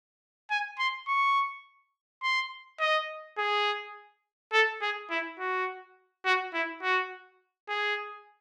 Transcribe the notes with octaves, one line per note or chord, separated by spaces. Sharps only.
G#5
C6
C#6
C6
D#5
G#4
A4
G#4
E4
F#4
F#4
E4
F#4
G#4